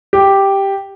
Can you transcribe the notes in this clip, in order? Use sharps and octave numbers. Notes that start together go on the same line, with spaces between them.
G4